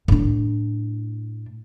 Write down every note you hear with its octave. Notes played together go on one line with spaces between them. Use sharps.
A2 D4